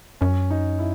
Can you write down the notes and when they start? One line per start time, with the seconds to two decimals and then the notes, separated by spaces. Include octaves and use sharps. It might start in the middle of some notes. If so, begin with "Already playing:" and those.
0.21 F#2 C#4
0.50 D#4
0.79 E4